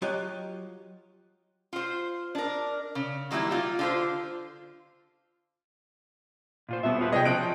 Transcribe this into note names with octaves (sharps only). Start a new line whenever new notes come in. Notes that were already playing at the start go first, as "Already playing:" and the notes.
F#3 F4 G4 C#5 D#5 F#5
F4 C5
D4 A#4
C#3
D#3 F#3 G3 A#3 E4
G3 F4
D3 F4 C5
A#2 F4 C5
D#1 B2 B3 E5
F4 B4 C5
C3 F#3 G#4 D#5 G5
F3 C#4 F#6 D7